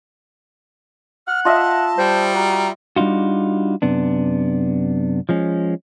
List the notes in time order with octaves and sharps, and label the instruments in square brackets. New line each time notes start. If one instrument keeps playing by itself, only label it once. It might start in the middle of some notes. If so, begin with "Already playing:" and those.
[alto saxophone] F#5 [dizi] F6
[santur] F4 D#5 E5 [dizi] A5
[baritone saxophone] G3 [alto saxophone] C5
[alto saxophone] F#4 [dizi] A#5
[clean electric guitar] G3 D4 D#4 F4 F#4
F#2 C3 B3 D4
F3 G#3 C#4